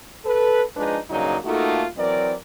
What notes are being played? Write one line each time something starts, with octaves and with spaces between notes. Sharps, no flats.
A4 B4
F3 G#3 D4 D#4 G#4 B4
G2 C#3 F#3 A#3 D#4 D5
A3 A#3 D#4 F4 F#4 A4
E3 F#3 C4 A#4 D5